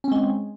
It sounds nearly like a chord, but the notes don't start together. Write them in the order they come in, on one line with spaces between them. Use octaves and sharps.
C#4 C4 G#3